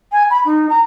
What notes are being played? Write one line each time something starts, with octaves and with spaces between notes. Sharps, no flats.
G#5
B5
D#4
A#5